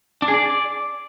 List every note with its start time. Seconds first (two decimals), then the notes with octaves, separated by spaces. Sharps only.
0.22 D4
0.28 G#4
0.34 D5